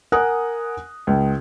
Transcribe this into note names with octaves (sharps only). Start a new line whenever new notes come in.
A#4 F#5 G#5 D#6 F#6
C#2